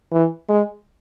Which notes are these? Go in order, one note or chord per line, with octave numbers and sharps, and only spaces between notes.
E3
G#3